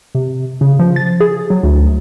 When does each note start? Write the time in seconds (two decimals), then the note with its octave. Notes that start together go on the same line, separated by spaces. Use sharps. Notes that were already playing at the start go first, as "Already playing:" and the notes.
0.15 C3
0.61 C#3
0.79 F3
0.96 A6
1.20 G#4
1.50 F#3
1.63 D2